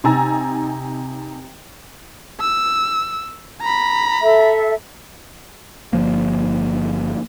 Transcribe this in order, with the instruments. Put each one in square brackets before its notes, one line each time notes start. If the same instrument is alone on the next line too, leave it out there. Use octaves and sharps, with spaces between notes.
[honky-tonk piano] C3 D#4 G#5 A#5 E6 A6
[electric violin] E6
A#5 B5
[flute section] A4 E5
[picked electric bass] G1 F3 A#3